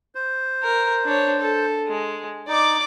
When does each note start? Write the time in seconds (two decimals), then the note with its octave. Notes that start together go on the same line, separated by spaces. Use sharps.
0.15 C5
0.63 A#4
1.04 D4 C#5
1.41 A4
1.88 G#3
2.48 D#4 D5 D6